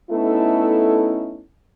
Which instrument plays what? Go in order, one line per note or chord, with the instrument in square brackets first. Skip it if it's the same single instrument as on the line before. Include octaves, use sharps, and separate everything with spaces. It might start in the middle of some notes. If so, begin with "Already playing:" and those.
[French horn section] A3 B3 C#4 D#4 E4 A4